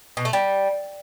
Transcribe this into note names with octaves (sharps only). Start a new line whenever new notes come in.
B2
A3
G3